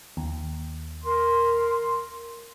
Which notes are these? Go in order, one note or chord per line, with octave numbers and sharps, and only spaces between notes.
D#2
A#4 C6